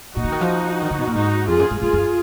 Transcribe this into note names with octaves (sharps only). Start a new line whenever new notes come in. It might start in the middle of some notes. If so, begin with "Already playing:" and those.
A#2 D#4 F#4
D3
D#3
F3
D#3
D3
B2
A#2
G#2 D#4 F#4
F2 F4 G#4
F#2
G#2
G#2 F4 G#4
F#2